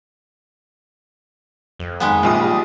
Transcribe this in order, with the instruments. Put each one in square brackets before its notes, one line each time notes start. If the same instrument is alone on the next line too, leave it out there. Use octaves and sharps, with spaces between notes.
[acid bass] F2
[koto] D#3 G#3 B3
[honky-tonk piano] A#1 F4 D#6 [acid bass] G3